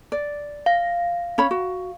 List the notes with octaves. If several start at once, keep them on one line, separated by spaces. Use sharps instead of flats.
D5
F5
C#4 C#5 B5
F#4